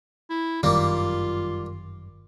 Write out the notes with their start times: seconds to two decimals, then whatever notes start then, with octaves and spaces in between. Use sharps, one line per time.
0.30 E4
0.63 G1 F#2 D#3 G3 A#3 F4